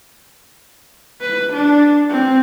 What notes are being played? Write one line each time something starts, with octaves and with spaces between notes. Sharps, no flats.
B4
D4
C4